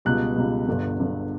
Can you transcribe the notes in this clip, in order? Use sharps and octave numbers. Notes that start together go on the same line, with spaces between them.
C#2 B2 G3 F#6
C#2 B2 G3
G1 G2 D3
G1 G2 D3